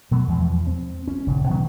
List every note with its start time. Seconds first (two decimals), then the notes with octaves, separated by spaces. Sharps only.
0.11 B2 F#3 A3
0.28 E2 F3 G#3
0.67 C4
1.08 C#4
1.27 D#1 G2 C#3
1.49 B2 D#3 F#3 A3